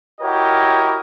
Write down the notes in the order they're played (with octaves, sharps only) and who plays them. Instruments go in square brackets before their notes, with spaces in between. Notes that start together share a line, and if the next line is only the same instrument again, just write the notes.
[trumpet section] E4 F#4 G4 A#4 C#5 D#5